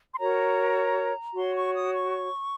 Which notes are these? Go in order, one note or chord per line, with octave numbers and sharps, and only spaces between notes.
C6
F#4 A#4 C#5 A#5
F#4 C#5 C6
C#6
D#6
C#6